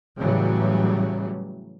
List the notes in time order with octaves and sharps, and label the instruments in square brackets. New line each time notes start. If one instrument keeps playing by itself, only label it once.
[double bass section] A2 C#3 E3 F#3 G3